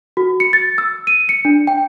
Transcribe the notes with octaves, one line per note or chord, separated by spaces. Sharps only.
F#4
C#7
A6
E6
D#7
C#7
D4
G5